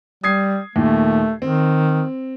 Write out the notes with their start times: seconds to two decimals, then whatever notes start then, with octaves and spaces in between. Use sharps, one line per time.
0.24 G3 D#6 G#6 C7
0.76 D#2 A#2 A3
1.42 D#3 C4